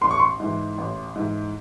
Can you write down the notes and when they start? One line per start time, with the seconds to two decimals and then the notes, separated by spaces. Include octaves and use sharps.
0.01 A1 C6
0.11 C#6
0.20 C6
0.40 G#2 E3
0.78 A1
1.15 G#2 E3